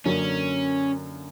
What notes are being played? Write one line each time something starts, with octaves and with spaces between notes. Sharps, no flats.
F#2 D3 F#3 A#3 C#4